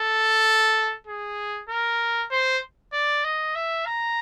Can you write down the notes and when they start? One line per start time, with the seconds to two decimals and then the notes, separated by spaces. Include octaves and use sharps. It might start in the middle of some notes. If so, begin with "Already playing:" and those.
Already playing: A4
1.07 G#4
1.69 A#4
2.31 C5
2.93 D5
3.24 D#5
3.55 E5
3.86 A#5